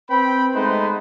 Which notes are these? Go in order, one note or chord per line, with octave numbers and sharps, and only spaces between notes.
C4 B4 G5 B5
G#3 A3 B3 D#4 B4 C5